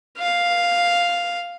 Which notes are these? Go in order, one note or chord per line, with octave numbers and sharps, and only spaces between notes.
F5